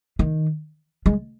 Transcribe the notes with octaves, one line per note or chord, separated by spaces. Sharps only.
D#3
G#3